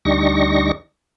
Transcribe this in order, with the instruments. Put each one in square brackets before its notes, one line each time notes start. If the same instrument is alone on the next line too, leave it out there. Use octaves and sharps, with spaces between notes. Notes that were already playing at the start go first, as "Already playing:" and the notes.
[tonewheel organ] D2 G3 D4 D#4 C#6 A#6